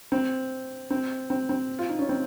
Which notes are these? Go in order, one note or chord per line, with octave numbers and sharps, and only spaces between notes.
C4
C4
C4
C4
F4
D#4
C#4
C4